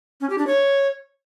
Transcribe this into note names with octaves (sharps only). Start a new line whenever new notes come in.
C#4
G4
D4
C#5